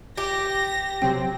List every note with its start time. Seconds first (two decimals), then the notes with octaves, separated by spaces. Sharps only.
0.18 G4 A#6
1.02 C3 F#3 C4 G5